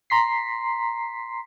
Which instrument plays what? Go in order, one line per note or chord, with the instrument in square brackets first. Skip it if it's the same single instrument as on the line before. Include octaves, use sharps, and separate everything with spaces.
[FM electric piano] A#5 C6 B6 C7